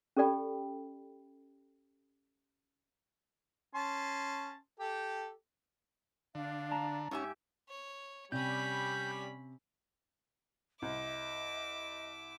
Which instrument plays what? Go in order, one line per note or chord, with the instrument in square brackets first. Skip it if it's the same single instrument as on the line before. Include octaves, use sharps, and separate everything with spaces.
[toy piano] C#4 G4 A4 D5 G5 B5
[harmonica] C#4 A5 C6
G4 A4
[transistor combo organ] D3 [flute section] D4 F5
[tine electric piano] A5 A#5
[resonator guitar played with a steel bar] G#2 E5 G#5 [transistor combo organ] C#4 [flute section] G4
[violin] C#5
[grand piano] C3 [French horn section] G3 [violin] C#4 B5 [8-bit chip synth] G6
[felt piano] C2 [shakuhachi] D#5 [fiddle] E5 D6